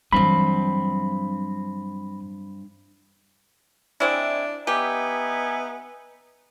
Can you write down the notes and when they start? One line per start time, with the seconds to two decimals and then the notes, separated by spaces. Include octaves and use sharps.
0.13 G2 E3 F#3 C4 B5
4.00 G#3 C4 D4 E4
4.67 B3 D#4 G4 E5 G#5